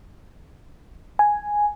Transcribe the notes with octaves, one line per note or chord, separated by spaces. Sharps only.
G#5